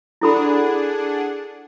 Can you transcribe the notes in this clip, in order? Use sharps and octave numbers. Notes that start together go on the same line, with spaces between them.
D4 E4 G#4 A4 F#5 B5